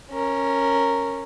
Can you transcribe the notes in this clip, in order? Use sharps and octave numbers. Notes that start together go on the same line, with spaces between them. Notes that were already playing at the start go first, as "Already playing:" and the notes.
C#4 A#4